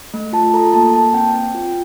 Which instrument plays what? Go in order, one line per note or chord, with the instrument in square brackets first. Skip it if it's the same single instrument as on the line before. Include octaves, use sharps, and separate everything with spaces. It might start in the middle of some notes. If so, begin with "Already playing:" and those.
[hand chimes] A3
F4 A5
A4 A#5
A#3 A5
A#3 A5
C4 G5
C4
F4